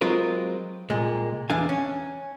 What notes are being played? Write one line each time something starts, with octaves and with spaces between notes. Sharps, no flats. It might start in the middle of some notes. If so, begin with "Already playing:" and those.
F#3 G#3 C4 F4 A#4 B4
C2 A#2 G#3
E2 E3 D4 F5 G#5
C#4